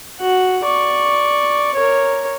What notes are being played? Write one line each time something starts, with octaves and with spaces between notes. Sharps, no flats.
F#4 F#5
D5 C#6
A#4 C#5